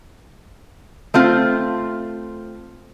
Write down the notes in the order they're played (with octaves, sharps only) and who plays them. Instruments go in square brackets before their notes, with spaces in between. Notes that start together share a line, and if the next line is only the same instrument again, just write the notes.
[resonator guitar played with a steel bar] A3 C4 F4